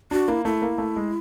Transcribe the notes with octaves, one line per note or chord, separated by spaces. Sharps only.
D4 F#4
A#3 E4
A3 E4
A#3
A3
G#3